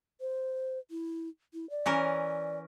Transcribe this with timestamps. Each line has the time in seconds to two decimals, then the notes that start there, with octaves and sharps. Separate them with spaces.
0.21 C5
0.91 E4
1.54 E4
1.70 D5
1.86 E3 C#4 A#4